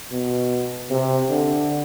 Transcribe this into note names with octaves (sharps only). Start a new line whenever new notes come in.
B2
C3
D3